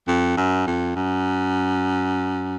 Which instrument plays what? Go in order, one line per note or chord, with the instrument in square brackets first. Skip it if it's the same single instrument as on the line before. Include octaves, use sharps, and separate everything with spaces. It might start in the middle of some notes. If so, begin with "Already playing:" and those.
[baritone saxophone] F2
F#2
F2
F#2